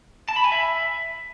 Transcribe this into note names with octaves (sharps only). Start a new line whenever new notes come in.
A5
B5
G#5
E5